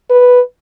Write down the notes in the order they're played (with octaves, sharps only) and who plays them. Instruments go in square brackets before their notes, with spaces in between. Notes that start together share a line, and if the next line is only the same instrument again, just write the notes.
[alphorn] B4